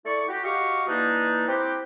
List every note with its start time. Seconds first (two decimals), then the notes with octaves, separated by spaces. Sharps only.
0.05 A3 E4 D5 C#6
0.28 F#4 G4
0.43 F#4 G4 D#5 F5 C#6
0.88 E3 A#3 D4 D#4
1.48 C4 E4 F#4 G4